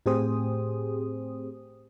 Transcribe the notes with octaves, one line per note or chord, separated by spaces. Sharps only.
A2 C4 G4 G#4 C5 D#6